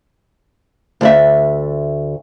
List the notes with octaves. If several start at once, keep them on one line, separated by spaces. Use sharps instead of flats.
D2 D5 E5